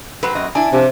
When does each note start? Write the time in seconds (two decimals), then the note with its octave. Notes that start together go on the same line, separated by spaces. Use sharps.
0.23 F#3 C4 B4
0.35 F#2 D#5
0.55 D4 E4 G#5
0.73 F2 C3 D4